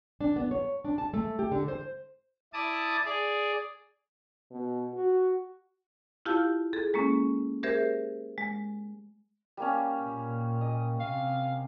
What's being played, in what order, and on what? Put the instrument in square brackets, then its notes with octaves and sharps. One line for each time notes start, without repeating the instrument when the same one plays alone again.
[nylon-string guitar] D4
B3
C#5
D4
A5
A3
G4
D3
C5
[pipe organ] E4 D5 A5 D6 D#6
G#4 D5
[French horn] B2
F#4
[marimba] E4 F4 G4 F5 A5
G#4 A4
G#3 A#3 C#4
G4 G#4 A#4 C5 E5
G#3
[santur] G3 A#3 C#4
[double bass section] A#2
[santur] D#5
[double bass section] C3 [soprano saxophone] F5